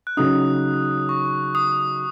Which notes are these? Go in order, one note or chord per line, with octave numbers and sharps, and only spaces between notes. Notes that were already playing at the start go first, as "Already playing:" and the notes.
F#6
C#3 F#3 D#4 D#6
C#6
D#6